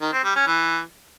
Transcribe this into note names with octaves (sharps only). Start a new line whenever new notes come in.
D#3
C4
G3
C#4
E3